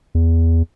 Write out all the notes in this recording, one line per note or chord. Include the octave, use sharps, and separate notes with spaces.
E2